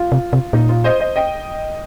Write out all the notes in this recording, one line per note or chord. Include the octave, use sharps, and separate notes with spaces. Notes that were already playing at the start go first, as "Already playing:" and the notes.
Already playing: F4
C3
C3
A#2 D#4
F4
C5 D#5
C5 D#5
D#5 G5